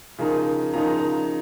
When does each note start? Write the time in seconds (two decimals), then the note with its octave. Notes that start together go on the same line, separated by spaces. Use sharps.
0.18 C#3 F3 A#3 D#4
0.74 C#3 F3 A#3 D#4 A#5
1.00 A#5